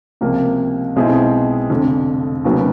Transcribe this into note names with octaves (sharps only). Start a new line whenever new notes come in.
C#2 C3 F3 A#3
B1 B2 G#3 C4 E4
F1 F2 D3
F1 D#2 C#3 F#3 B3